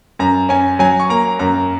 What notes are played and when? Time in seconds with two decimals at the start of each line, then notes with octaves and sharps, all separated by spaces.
0.19 F#2 A#5
0.49 C#4 G#5
0.79 F#3 G#5
1.00 C#6
1.09 A#3 A#5
1.39 F#2 A#5